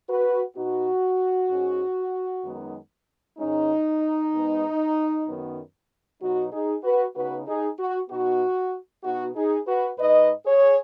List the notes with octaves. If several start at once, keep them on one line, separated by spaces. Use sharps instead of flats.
F#4 B4
B2 B3 D#4 F#4
G#2 G#3 C#4
F#2 D#3 G#3 B3 D#4
G#2 D#3 G#3 C#4 D#4
G#2 G#3 B3
F#2 D#3 F#3 B3
B2 F#3 B3 D#4 F#4
D#4 G#4
F#4 B4
C#3 B3 D#4 F#4 B4
D#4 G#4
F#4
B2 B3 D#4 F#4
B2 B3 D#4 F#4
D#4 G#4
F#4 B4
G#2 G#3 D#4 B4 D#5
G#4 C#5